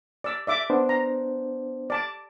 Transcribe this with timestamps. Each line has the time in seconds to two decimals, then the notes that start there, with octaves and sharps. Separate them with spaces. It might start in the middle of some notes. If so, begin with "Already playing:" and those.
0.24 D5 E6
0.47 D5 E5 D6
0.70 B3 D4 C5
0.89 A#5
1.90 D5 A5 D6